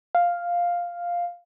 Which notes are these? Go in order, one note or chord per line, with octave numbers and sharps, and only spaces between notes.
F5